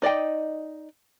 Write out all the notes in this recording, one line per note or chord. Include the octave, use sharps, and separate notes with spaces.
D#4 D5 D#5 G5